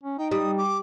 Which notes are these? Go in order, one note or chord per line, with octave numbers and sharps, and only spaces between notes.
C#4
D#4 G5
G3 D#6
D6